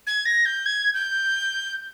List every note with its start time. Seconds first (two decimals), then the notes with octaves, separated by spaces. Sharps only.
0.07 G#6
0.26 A#6
0.45 G6
0.66 G#6
0.94 G6